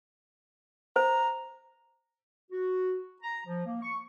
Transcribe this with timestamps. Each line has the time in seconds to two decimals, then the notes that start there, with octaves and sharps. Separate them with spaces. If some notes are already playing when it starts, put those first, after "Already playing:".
0.96 C5 A#5
2.50 F#4
3.22 A#5
3.45 F3
3.65 A#3
3.83 C#6